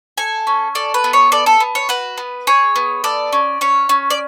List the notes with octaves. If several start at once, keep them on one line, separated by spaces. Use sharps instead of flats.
A4 G#5
C#4
A4 D5
B4
B3
C#5
A4 D5
A4
B3
C#5
F#4 B4
B3
G#4 C#5
B3
A4 D5
C#4
C#4 C#5
C#4
D5